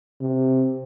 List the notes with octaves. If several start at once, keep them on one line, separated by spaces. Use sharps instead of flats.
C3